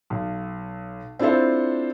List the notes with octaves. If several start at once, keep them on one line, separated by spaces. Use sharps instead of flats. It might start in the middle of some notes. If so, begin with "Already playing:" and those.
B1
C4 D4 E4 F4 A4 C5